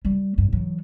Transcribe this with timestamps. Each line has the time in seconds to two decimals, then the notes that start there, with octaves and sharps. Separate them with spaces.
0.05 G3
0.38 G2
0.53 E3 F#3